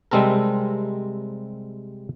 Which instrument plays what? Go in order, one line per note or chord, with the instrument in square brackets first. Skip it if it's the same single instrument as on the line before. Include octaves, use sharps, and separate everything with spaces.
[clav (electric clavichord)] C3 G3 G#3 C4 A4 A#4